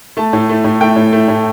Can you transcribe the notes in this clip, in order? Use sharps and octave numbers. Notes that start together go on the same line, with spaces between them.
A3 A5
A2
A3
A2
A3 G5
A2
A3
A2